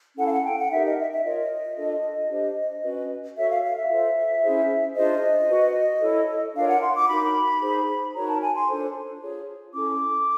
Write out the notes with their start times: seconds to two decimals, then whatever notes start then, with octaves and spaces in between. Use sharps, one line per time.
0.17 C#4 E4 A4 F#5
0.25 F5
0.31 F#5
0.44 G5
0.57 F#5
0.70 D#4 G4 A#4 E5
0.84 D#5
0.97 E5
1.10 E5
1.23 F4 A#4 C#5 D#5
1.77 D4 F4 A4
2.29 D4 G4 C5
2.83 C#4 F#4 B4
3.36 F#4 A4 C#5 E5
3.49 F5
3.62 F5
3.76 E5
3.89 F4 A4 C5
4.42 C#4 E4 G#4 C5
4.96 D4 F4 G#4 C5 D#5
5.48 F#4 B4
6.02 E4 A4 C#5
6.55 D4 F4 A#4 C#5 F5
6.68 F#5
6.81 C6
6.95 D6
7.08 D#4 F#4 A#4 B5
7.62 D#4 G#4 C5
8.14 D#4 F#4 A#4 C#5 A#5
8.27 A5
8.41 G#5
8.55 C6
8.67 D4 F4 A4 C5
9.21 F4 G#4 C#5
9.74 C#4 E4 A4 D6